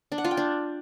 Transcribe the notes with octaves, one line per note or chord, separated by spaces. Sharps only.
D4
F#5
F4
G5
D4